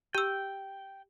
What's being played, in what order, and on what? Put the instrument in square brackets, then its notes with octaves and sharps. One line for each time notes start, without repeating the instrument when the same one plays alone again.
[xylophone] G4 E6 [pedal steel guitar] G5